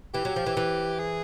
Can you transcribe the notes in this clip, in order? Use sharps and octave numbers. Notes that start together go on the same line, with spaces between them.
E3 G4
F#3
F3
E3
E3
G#4